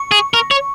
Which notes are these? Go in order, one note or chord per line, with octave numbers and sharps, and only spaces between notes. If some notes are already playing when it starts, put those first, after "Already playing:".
Already playing: C#6
G#4
A#4
C#5